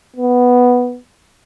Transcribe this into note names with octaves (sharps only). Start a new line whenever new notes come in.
B3